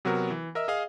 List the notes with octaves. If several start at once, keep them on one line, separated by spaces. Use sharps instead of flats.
C3 F#3 B3 F#4 A#4
E3
A#4 D#5 E5 E6
G#4 D#5 F5